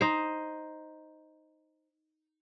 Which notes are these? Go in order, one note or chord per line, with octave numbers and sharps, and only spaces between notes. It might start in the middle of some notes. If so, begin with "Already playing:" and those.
D#4 C5